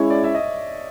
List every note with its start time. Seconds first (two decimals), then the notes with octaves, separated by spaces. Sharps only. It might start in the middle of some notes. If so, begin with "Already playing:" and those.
Already playing: G#3 C#4 E4 C#5
0.10 D5
0.24 E5
0.35 D#5